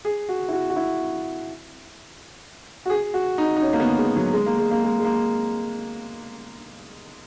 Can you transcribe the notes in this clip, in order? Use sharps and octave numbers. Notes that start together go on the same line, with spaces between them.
G#4
F#4
E4
F#4
F#4
E4
F#4
G#4
F#4
D#4
D#4
C#4
A#3
B3
G#3
F#3
G#3
A#3
G#3
A#3
G#3
G#3
A#3